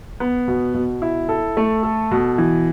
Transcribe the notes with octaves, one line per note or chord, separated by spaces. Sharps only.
B3
B2
B2
E4
A4
A3
A4
B2
E3